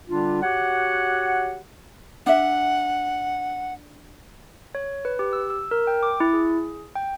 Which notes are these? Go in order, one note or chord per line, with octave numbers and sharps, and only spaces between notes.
D3 G3 D4 F4
F#4 G4 C#5 F#5
D4 E5 F#5
C#5
B4
G4
E6
E6
A#4
G5
D6
E4
G#4
G5